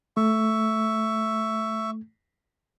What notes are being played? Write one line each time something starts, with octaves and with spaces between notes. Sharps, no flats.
A3 E5 C#6